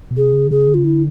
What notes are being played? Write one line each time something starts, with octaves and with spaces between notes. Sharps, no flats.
B2
C3 G#4
C#3
D3
C#3 G#4
D3
C#3 F4
D3 E4